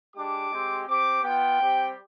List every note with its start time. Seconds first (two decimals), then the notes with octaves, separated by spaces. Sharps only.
0.15 G#3 D4 G4 D6
0.51 G#3 C4 G4
0.87 C4 G4 D6
1.24 B3 F4 G5
1.61 G3 C4 G4